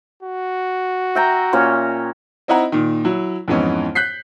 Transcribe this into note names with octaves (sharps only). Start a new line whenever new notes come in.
F#4
E5 G5 A#5
A#2 C#4 C#5
C4 D#4 E4 D#5 F#5 A#5
A#2 D#3
F#3 E4
F2 G#2 E3 B3 C#4 D#4
F#6 G6 B6 C7